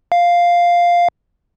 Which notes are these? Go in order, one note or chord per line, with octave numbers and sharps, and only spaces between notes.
F5